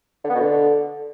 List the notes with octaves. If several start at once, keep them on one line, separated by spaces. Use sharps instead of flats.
D3
B3
B2
D3